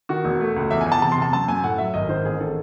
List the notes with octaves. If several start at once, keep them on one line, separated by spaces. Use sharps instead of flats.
D#3 F#4
E1
A3
C#2
E2 E5
G#5
E2
A5
C3 A5
C6
C3 A5
F#2 A5
F#2 G#5
A2 F#5
F#3 E5
G#1 D#5
D#3 C5
A1 G#4
D#3 A4